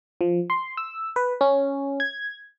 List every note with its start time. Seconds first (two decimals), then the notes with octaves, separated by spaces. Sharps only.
0.21 F3
0.50 C6
0.77 E6
1.16 B4
1.41 C#4
2.00 G#6